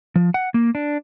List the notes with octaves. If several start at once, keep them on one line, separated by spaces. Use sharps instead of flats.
F3
F#5
A#3
D4